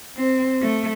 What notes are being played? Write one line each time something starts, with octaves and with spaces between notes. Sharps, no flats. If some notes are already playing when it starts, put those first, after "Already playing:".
C4
A3